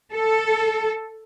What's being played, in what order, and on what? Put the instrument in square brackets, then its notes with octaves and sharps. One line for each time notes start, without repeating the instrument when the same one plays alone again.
[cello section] A4